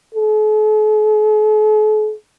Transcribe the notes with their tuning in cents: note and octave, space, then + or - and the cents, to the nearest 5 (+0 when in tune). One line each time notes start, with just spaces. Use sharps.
A4 -45